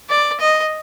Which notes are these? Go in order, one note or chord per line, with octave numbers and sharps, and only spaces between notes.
D5
D#5